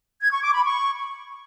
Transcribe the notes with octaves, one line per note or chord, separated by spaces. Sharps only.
G#6
C#6
D6
B5
C#6